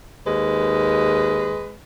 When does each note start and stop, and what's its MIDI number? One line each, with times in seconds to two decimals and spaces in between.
0.27 1.73 39
0.27 1.73 56
0.27 1.73 71